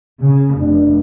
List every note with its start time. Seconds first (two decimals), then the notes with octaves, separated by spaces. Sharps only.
0.23 C#3
0.59 F1 D4